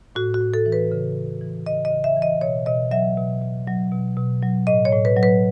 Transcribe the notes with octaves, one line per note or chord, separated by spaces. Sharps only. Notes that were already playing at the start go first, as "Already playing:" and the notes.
A2 F#4
F#4
A2
A4
E3
B4
C#3
C#3
E3
C#3 D#5
D#5
C#3
E5
E3
D#5
B2 C#5
B2 D#5
F#3 E5
B2
B2
F#3
B2
B2
F#3
A2 D#5
C#5
A2
B4
F#3
B4